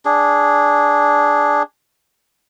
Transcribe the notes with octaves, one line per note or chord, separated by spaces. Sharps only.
D4 G#4